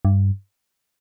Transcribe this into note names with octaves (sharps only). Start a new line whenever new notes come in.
G2